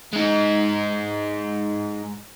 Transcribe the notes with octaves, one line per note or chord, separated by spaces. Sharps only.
G#3 D#4